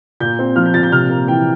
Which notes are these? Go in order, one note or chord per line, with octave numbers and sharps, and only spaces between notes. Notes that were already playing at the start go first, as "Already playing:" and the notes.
A#2 G6
C4
F3 F6
G6
A#2 A6
G6
C3 F6
A#3
E3 G5